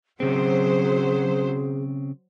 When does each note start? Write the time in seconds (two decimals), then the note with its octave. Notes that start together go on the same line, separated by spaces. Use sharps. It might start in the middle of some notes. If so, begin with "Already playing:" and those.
0.20 C#3 F#3 C4 G#4 C5